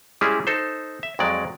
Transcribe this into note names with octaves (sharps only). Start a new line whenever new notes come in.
G3 G#3 C#4 E4 G#4
D#4 A4 C5
E5
F2 F#3 G#3 D5